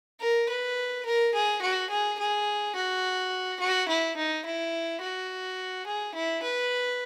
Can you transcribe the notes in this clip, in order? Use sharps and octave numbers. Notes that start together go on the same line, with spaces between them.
A#4
B4
A#4
G#4
F#4
G#4
G#4
F#4
F#4
E4
D#4
E4
F#4
G#4
E4
B4